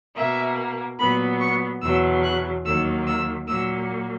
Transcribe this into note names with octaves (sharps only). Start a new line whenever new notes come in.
B2 A#3 E5
A#2 F#3 B3 B5
C#6
E2 B2 F#3 E6
F#6
D#2 D#3 F#3 A#3 E6
E6
A#2 F#3 A#3 E6